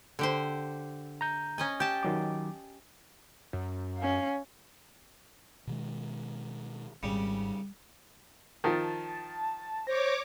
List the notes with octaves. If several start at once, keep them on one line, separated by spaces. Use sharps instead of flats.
D3 G4 C5
A#5 G6
C#4 D#5 G#5
G4 A5 G6
D#3 F#3 D6
F#2
C#4 F5
B2 D#3 G#3
G#1 G#2 C#3 G3
D#3 F3 A5
C5 C#5 D6 A#6